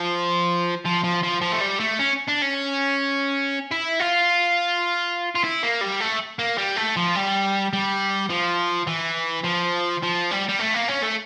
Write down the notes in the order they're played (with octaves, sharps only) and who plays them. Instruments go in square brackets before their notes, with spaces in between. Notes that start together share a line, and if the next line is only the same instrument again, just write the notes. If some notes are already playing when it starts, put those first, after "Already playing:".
Already playing: [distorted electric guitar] F3
F3
F3
F3
F3
A3
G3
A3
C#4
D4
C#4
E4
F4
F4
E4
A#3
G3
A3
A#3
G3
A3
F3
G3
G3
F3
E3
F3
F3
G3
G3
A3
A#3
C#4
A3